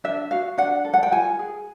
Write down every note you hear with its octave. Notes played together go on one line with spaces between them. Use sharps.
D4 E5
F#4 F5
D4 F#5
A4
F#5
G5
F4 G#5
G#4